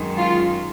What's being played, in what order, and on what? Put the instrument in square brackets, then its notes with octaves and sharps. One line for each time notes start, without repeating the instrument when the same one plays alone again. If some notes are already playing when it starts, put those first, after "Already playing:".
Already playing: [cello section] F#2 D#3 G#3
[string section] F4